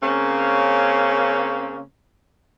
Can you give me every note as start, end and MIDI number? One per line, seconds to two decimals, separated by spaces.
0.03 1.81 49
0.03 1.81 58
0.03 1.81 60
0.03 1.81 61